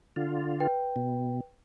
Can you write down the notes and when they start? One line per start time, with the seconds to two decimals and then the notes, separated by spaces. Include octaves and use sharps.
0.16 D3 F4
0.60 B4 G5
0.96 B2